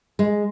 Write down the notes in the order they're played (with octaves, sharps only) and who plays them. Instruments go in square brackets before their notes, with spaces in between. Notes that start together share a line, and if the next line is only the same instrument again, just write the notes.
[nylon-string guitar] G#3